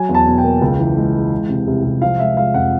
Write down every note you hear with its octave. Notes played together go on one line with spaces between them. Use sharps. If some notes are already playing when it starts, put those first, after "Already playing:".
Already playing: F#3 G#5
E2
A5
B2
G5
A#3
C#2
E3
G#3
G#3
E3
C3
C2
C2
F3 F5
G#3 E5
G#3 F5
F2 F#5